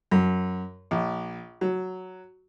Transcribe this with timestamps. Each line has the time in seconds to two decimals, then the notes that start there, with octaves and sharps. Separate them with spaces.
0.11 F#2
0.91 A#1
1.61 F#3